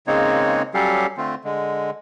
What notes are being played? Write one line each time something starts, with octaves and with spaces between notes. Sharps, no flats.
C#3 G#3 A#3 C4 D#4 C#5
F#3 G3 C#4 G4 A4 F5
D3 A3 C4 F4
D3 G#3